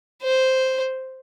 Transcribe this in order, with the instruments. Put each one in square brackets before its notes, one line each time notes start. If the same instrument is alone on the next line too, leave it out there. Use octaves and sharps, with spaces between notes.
[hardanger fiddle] C5